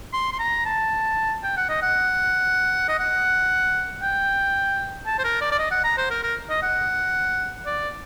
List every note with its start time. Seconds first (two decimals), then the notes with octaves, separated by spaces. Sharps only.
0.14 C6
0.33 C6
0.39 A#5
0.66 A5
1.43 G5
1.57 F#5
1.69 D#5
1.83 F#5
2.89 D#5
2.99 F#5
4.03 G5
5.06 A5
5.19 C5
5.24 A#4
5.41 D5
5.52 D5
5.59 D#5
5.71 F#5
5.84 A#5
5.98 C5
6.10 A#4
6.23 A#4
6.50 D#5
6.63 F#5
7.66 D5